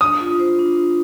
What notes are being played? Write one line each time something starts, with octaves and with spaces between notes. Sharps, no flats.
D4 D#6
F4
C5
D4
D4